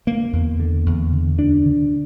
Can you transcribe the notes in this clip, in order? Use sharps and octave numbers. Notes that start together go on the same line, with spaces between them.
D3 A#3
E2
D3
E2
D3
D2 D4
D3